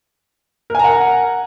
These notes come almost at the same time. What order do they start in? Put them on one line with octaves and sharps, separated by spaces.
A#4 G#5 A#5 F#5